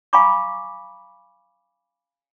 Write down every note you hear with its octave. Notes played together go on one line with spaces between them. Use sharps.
F5 G#5 A#5 B5 C#6 D6